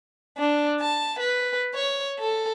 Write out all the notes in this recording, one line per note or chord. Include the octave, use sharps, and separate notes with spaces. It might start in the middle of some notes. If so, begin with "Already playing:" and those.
D4
A5
B4
C#5
A4